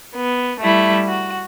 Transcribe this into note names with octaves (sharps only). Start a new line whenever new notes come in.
B3
G3 A3 E4
F#4